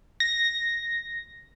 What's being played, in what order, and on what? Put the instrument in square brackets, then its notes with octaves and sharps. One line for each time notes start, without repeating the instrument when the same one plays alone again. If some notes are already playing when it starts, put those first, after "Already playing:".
[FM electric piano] A#6